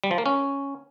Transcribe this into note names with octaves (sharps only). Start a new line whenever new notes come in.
G3
F3
A#3
C#4